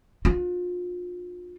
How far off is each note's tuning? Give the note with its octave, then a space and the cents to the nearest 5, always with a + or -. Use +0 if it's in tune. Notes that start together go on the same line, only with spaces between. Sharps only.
D4 +35 F4 +35